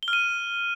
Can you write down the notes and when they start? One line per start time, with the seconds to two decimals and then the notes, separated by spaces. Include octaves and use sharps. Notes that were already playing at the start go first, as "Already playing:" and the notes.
0.03 G7
0.08 F6
0.13 D#7